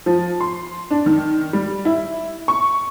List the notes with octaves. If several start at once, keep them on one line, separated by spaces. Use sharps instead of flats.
F3
C6
D4
D#3
G3
E4
C#6